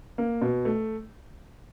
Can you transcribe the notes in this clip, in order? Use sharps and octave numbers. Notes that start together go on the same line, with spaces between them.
A#3
B2
A3